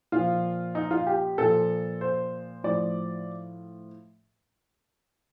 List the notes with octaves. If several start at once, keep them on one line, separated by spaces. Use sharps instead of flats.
A#2 F3 F4
D#4
F4
G4
A#2 F3 A4
C5
A2 F3 D5